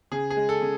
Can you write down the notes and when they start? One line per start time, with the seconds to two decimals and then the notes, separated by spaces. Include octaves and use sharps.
0.12 C#3 G#4
0.30 G#4
0.37 G#3
0.49 A4
0.62 C#3